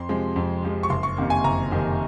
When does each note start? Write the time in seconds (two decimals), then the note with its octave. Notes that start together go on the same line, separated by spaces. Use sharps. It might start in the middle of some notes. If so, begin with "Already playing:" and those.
Already playing: F2 C6
0.09 C3 F3 G#3
0.36 F2
0.63 C3 F3 G#3
0.83 C#6
0.90 F#1 C6
1.03 C#6
1.17 F2 C3 D#3 A#3
1.30 G#5
1.44 F#1 A#5
1.71 F2 C3 D#3 A#3